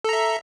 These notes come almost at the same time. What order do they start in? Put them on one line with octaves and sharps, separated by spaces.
A4 A#5 E5